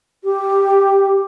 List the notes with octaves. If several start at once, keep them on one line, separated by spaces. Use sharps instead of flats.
G4